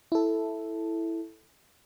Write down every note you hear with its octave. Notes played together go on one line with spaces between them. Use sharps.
E4 A4